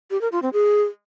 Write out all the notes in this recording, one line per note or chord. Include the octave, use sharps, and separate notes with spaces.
G4
A#4
F4
C4
G#4